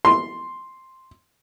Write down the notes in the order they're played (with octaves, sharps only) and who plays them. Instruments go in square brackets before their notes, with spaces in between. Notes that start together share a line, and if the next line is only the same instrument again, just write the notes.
[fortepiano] C6